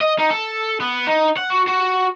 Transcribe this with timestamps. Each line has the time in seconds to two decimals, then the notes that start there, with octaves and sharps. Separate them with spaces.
0.01 D#5
0.19 D#4
0.30 A4
0.80 B3
1.07 D#4
1.37 F#5
1.50 F#4
1.67 F#4